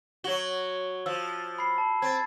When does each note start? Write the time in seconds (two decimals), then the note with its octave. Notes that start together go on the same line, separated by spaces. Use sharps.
0.24 F#3 F#4 G#6 F#7 G7
1.06 F3 E6
1.58 B5 C7
1.78 A5
2.02 C4 G#6 A6